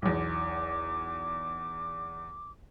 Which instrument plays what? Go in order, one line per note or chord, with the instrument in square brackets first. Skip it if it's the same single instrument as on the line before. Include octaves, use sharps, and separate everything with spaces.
[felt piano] B1 E2 [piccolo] D6